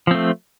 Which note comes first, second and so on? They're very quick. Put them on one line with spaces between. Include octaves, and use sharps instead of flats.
F3 C4 A3